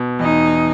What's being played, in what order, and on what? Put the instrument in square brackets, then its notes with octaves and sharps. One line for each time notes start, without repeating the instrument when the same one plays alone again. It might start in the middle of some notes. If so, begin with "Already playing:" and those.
Already playing: [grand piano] B2
[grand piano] E2 [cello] D#4